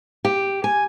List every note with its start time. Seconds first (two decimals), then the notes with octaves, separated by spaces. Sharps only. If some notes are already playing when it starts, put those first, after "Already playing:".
0.25 G4
0.64 G#5